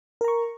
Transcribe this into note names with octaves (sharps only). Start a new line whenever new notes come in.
A#4 A#5 C#6